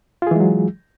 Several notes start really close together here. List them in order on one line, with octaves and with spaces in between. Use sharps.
F4 G#4 E3 G#3 F#3